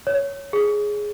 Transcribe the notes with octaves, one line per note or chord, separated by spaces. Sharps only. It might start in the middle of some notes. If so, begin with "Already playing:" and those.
C#5
G#4